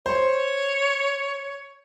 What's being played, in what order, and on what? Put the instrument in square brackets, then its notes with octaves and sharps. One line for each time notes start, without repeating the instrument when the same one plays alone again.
[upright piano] C5 [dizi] C#5